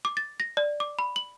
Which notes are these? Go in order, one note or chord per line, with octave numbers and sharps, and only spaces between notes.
D6
A6
A#6
D5
D6
B5
F#7